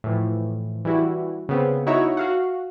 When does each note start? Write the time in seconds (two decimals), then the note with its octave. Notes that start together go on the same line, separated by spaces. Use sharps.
0.04 A2 E3 F3
0.85 E3 G3 E4 F#4
1.49 C#3 B3 C4
1.87 D#4 E4 F#4 C#5 E5 A#5
2.17 F#4 F5 F#5